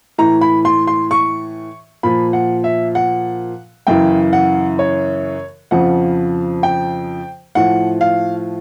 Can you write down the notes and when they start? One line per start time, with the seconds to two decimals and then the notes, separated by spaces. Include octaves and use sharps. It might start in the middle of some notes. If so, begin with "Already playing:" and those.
0.18 A2 E3 A#5
0.41 B5
0.65 C6
0.87 C6
1.11 C#6
2.03 A#2 F3 B5
2.33 F#5
2.64 E5
2.95 F#5
3.87 F#2 C#3 E3 G5
4.33 F#5
4.79 C#5
5.71 F2 C#3 F3 F#5
6.63 G5
7.55 A2 F3 F#5
8.01 F5